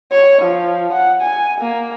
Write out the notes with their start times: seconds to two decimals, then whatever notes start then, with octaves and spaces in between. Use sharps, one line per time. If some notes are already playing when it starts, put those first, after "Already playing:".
0.12 C#5
0.42 F3
0.92 F#5
1.21 G#5
1.61 A#3